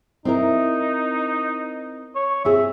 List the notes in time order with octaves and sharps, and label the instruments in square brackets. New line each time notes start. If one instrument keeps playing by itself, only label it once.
[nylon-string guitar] C4 E4 A#4 [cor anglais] D#4
[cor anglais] C#5
[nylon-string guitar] C4 F4 G#4 [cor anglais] E5